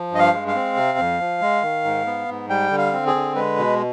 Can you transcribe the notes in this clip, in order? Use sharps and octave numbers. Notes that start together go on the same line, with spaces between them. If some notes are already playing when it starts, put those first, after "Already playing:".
Already playing: F3
G2 D#5
F5
G#3
F5
C4
C3
F2
F3
G#3
D#3
G#2
B3
G#2
G3 G5
D3
F5
C4
G#4
D3
G#3 B4
B2